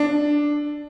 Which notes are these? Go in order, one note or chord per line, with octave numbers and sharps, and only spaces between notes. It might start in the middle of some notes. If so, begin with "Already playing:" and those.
Already playing: D4